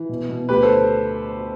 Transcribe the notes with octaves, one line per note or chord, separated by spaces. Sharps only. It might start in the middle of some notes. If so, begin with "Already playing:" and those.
Already playing: E3
B2
B2
D2 G4 B4
A4 C5